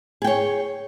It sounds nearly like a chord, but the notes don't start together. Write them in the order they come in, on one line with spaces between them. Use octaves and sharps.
G#4 G5 C#5